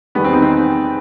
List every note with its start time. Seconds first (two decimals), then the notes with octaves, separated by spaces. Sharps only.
0.15 E2 D#3 G3 B3
0.24 C4
0.33 D#4
0.42 C4